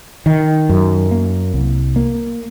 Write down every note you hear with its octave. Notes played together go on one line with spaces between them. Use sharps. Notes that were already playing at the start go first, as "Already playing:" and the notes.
D#3
F#2
A#3
C2
A#3